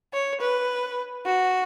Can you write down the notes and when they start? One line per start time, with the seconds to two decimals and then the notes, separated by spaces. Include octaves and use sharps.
0.13 C#5
0.41 B4
1.25 F#4